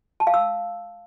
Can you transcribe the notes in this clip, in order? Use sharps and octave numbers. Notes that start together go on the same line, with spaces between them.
A5
F5
E6